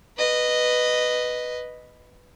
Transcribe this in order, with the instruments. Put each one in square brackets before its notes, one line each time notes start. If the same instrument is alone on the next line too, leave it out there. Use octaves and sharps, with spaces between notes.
[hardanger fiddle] B4 D#5